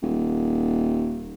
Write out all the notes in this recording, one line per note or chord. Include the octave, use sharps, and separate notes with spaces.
D#1